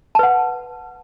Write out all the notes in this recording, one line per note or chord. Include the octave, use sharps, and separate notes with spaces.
B4 F#5 A5